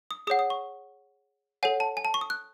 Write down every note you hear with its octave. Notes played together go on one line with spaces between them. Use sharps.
D#6
G#4 C#5 F#5 D#6
D#6
C#6
A4 C#5 F#5 G#5
A5
G#5
A5
C#6
D#6
F#6